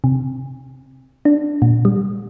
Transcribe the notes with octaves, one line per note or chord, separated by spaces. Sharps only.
C3
D4
A#2
G3